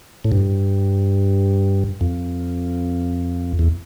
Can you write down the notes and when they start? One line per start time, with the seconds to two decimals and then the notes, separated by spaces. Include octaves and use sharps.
0.24 A2
0.32 G2
2.01 F2
3.59 E2